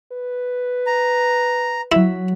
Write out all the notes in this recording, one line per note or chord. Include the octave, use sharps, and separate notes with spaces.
B4
A#5
F#3 E4 B6